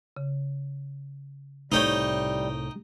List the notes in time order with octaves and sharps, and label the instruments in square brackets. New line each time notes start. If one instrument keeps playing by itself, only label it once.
[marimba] C#3
[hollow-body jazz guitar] C2 A2 C#5 [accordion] G3 [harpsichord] D#4 G5